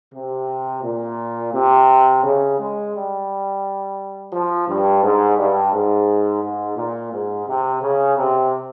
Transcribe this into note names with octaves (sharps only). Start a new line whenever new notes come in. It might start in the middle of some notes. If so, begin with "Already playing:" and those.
C3
A#2
C3
C#3
G#3
G3
F3
G2
G#2
G2
G#2
G#2
A#2
G#2
C3
C#3
C3